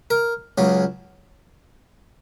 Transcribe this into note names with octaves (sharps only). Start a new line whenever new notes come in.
A#4
C#2 C#3 F#3